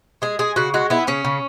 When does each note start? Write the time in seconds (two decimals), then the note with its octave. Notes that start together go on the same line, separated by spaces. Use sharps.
0.22 G#3 G#4
0.39 G#3 G#4
0.56 C#3 F#4
0.74 G#3 F#4
0.90 B3 E4
1.07 C#3 C#4
1.24 C#3